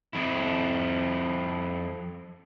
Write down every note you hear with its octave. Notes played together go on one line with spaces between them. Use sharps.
F2 E4